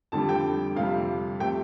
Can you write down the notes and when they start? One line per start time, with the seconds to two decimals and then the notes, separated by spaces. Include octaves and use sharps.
0.12 F2 D3 G3 A5
0.29 G5
0.76 F2 C3 G3 F5
1.40 C3 F3 A3 G5